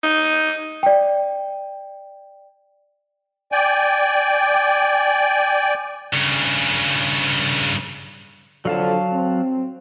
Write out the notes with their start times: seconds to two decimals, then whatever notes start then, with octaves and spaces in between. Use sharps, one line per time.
0.03 D#4
0.83 D5 G5
3.52 D5 G5 G#5
6.13 G2 C#3
8.65 F2 D3 F#3 F5 A5
9.13 C4